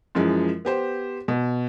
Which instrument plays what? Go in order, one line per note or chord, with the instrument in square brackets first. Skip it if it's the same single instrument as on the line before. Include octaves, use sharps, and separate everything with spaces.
[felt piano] F#2 E3 F3 G#3
B3 G4 C5
B2